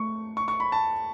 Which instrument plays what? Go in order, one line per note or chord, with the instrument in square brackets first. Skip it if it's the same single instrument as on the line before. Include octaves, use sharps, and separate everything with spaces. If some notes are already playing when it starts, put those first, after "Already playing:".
Already playing: [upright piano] A3 [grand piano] C#6
[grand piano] C#6
C#6
B5
A5